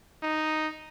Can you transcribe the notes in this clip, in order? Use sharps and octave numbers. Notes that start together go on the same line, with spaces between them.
D#4